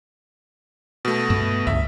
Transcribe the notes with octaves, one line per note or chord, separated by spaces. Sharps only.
B2 A3
G2 B3
C#2 G2 E5